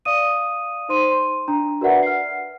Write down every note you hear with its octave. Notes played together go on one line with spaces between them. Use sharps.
D5 F5 D#6 D#7
D#4 C5 C6 D#7
C6
D4 A#5
F#4 A#4 B4 D5 E5 F#5
F6 C7